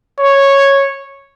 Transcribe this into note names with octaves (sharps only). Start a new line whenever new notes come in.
C#5